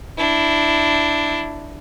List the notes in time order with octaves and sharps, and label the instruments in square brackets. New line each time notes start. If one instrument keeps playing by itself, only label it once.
[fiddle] D4 E4